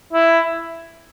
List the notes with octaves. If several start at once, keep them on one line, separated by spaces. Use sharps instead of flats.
E4